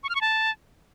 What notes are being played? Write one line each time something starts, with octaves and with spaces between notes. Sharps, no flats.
C#6
F6
C#6
A5